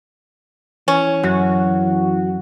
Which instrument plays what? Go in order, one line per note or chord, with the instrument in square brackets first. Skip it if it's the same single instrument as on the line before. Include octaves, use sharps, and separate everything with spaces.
[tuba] E3 [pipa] C#4
[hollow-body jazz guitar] F#2 [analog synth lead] F#4